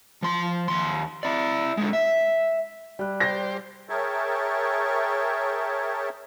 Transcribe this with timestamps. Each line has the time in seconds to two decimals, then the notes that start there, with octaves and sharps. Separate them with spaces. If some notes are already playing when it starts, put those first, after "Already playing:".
0.23 F3 C6
0.68 D#2 C6
1.23 E4 D5
1.77 D3 G#3
1.93 E5
2.99 G3 D5 F#6
3.20 G4 C5 A#6
3.89 G#4 A#4 C#5 E5 G5 A5